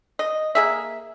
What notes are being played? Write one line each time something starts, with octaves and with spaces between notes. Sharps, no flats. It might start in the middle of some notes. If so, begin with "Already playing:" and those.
D#5
A#3 G#4 E5